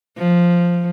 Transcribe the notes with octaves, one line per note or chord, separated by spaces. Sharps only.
F3